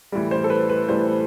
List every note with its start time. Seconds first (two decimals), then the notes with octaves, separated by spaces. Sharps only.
0.12 A2 E3 G3
0.31 C5
0.44 A4
0.50 B4
0.69 B4
0.89 A2 E3 G3 C5